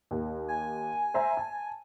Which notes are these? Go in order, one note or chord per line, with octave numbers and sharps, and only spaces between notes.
D#2
G#5
C5 E5 A#5
A5